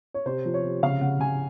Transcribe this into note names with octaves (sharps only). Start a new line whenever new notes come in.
C#5
C3 C5
F3
C#5
C3
C#3 F5
C#3 F#5
C#3 G#5